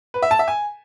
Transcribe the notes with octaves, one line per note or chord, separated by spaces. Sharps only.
B4
E5
A5
E5
G#5